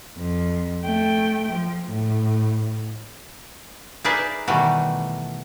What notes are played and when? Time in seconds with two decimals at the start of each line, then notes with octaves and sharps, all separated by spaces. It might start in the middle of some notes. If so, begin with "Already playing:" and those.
0.18 F2
0.85 A3 G5
1.53 F3
1.88 A2
4.04 D#4 G#4 A#4 B4 D5 E5
4.47 B2 D#3 E3 G3 A3 F#4